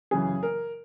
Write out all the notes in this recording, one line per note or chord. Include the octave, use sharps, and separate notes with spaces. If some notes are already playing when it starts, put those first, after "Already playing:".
F#2 C#3 E3 G#4
A#4